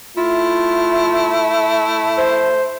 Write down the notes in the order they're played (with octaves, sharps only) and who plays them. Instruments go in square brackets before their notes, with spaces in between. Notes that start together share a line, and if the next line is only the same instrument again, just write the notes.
[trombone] A3 [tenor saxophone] E4 [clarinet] F4
[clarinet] C5